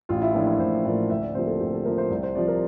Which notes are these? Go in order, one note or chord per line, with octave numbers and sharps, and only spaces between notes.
A1 F4
E4
A2 F3 A#3 D4
E4
A1 C5
A2 F3 A#3 D5
D2 E5
D5
C3 F3 A#3 C5
A4
D2 G4
A4
C3 F3 A#3 A#4
C5
C2 D5
C5
C3 F3 D5
A#4